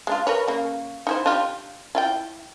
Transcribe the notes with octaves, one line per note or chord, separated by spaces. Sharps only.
G#3 D4 F4
A#4 B4 C#5
C#3 A#3
D#4 E4 C5
D4 F4 G4
E4 F4 G5